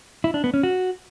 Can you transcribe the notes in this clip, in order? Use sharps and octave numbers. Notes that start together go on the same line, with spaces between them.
E4
D4
B3
C#4
F#4